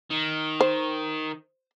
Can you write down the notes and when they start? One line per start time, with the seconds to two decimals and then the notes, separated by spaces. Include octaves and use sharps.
0.10 D#3
0.61 C5